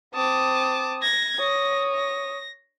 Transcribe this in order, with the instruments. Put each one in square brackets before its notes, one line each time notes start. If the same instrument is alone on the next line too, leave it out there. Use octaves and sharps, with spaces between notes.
[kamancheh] C4 D#6 [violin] A5 D6
[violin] G#6 A#6
[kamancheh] C#5 D#6 [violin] A#6
[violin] A#6